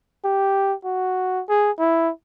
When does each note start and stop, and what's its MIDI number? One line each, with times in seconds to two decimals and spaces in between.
0.24 0.74 67
0.84 1.42 66
1.49 1.71 68
1.79 2.10 64